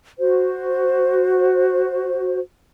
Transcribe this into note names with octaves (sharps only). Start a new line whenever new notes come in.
F#4 C5